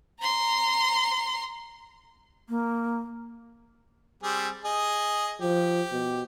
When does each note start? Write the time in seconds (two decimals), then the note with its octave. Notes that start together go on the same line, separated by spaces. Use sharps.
0.20 A#5 C6
2.49 A#3
4.23 G3 C4 G#4
4.64 G#4 D#5
5.41 F3 G4
5.91 B2